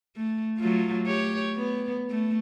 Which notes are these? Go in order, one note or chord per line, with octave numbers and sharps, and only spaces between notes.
A3
F#3 A3 F4
G4 C#5
B3
A3